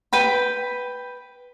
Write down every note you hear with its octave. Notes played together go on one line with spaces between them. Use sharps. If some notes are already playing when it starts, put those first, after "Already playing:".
B4 G5 B5